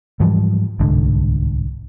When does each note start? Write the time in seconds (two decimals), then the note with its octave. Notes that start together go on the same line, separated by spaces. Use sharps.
0.20 G#2 E3 F3 G3
0.80 D1 C2 G#2 D3